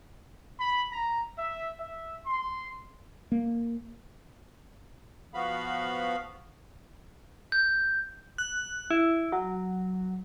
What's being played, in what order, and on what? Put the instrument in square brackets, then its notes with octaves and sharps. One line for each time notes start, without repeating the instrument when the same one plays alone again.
[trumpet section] B5
A#5
E5
E5
C6
[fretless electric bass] A#3
[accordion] F3 B3 F#4 F5 B5
[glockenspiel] G6
[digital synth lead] F#6
E4
F#3